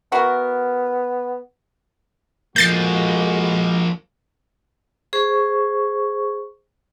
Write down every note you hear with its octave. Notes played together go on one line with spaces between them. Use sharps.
B3 E4 F#4 A#4
F2 F3 G#3 A#3 F#4 G6 A6 C7
G#4 C5 C#6